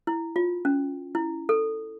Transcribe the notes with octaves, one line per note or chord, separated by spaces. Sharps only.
E4
F4
C#4
E4
A4